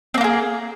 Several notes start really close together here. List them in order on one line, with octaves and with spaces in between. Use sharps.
C4 A#3 F4 G#4